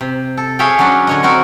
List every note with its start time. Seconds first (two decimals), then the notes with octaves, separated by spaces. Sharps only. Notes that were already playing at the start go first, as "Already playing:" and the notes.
0.01 C3
0.37 A4
0.59 G#4 C#5 E5 F5 G5
0.79 F#3 C#4 D4 F#4
1.07 D3 C#5 D#5
1.23 D3 C4 F#4 A#4